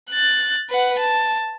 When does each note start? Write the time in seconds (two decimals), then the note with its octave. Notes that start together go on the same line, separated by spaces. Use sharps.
0.11 F#6 A6
0.70 B4 F#5
0.99 A5